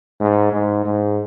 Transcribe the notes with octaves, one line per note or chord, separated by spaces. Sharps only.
G#2
G#2
G#2